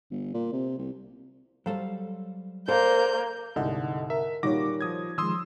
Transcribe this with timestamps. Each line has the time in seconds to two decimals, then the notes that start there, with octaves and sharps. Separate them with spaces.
0.11 G1
0.34 A#2
0.53 C3
0.78 C2
1.66 F#3 G3 A4 C5 F5
2.68 A#3 A4 C5 D5 F5 G6
3.56 C2 G#2 D3 A4 D#5 F#5
4.10 A#4 E5
4.43 A#2 D#3 G3 D#4 F#4 C#5 D6 A#6
4.81 F3 D#6 G#6
5.18 D#3 F3 G#3 C6 D#6 E6